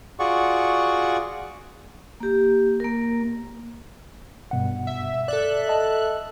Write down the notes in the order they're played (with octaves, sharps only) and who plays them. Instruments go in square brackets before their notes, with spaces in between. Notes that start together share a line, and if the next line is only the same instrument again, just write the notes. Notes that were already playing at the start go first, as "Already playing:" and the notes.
[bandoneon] F4 F#4 G#4 D5 F#5 C#6
[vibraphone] A#3 G4
A#3 A#4
[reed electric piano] G2 B2 F#5
[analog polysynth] E5
[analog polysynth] A4 E5 F#6 [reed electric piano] D5
[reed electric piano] D#5 A5